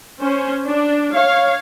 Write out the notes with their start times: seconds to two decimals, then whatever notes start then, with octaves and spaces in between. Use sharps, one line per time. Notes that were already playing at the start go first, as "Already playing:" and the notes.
0.21 C#4 C5
0.68 D4
1.14 C#5 F5